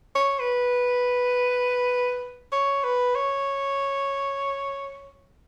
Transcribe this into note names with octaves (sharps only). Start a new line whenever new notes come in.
C#5
B4
C#5
B4
C#5